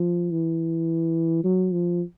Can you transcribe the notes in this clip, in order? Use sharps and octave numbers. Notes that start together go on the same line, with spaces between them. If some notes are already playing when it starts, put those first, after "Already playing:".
Already playing: F3
E3
F#3
F3